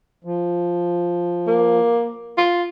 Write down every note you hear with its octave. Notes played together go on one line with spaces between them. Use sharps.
F3
A#3
F4